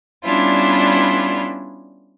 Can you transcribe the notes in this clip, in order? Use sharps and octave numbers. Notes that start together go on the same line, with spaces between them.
G3 B3 C#4 D4 E4 F4